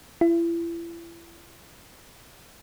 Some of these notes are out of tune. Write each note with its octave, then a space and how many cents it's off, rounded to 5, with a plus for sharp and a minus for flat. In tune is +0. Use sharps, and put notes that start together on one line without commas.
E4 +35